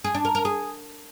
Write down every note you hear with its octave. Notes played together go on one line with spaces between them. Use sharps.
G#4
D4
A#4
A#4
G#4